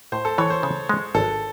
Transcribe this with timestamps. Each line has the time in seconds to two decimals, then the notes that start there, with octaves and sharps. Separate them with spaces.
0.12 A2 C5
0.25 A4
0.38 E3 C#5
0.50 C5
0.63 C#3
0.89 G#3
1.15 G#1 A4